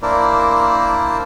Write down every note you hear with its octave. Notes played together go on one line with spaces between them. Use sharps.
A#3 D4 E4 A#4 C5 D5